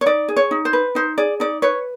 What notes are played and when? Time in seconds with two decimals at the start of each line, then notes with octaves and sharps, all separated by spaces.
0.01 C#5
0.06 D#4 D5
0.28 G#4
0.36 C#5
0.51 D#4
0.65 C5
0.73 B4
0.95 D#4 C5
1.18 G#4 D5
1.40 D#4 D5
1.62 B4 C#5